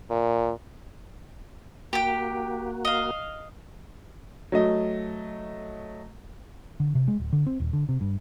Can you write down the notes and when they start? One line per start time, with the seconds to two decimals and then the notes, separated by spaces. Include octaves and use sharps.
0.10 A#2
1.93 A#3 F#4 G4 G5
2.85 D#5 F5
4.52 F#3 A3 D#5
6.80 D3
6.95 C3
7.08 G#3
7.20 D1
7.33 D3
7.47 C4
7.60 D#1
7.73 D3
7.89 C3
8.01 G2